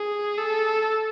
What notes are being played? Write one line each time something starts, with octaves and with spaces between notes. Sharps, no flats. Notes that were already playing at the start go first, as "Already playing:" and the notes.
Already playing: G#4
A4